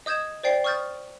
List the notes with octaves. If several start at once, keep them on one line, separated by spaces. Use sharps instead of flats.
D#5 D#6 G6 G#6 E7
C5 D5 G5 C7
C#6 D#6 F6 G6 A6